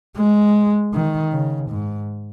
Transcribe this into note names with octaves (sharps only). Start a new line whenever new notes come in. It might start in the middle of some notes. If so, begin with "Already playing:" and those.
G#3
D#3
C#3
G#2